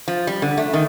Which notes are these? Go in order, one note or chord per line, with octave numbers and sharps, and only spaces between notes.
F3
G3
D3
A3
D#3